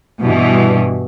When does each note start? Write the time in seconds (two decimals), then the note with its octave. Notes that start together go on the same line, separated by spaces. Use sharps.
0.21 G2 B2 E3